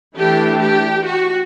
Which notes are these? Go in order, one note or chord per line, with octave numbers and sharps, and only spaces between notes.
E3 A3 D4 G4
G4
F#4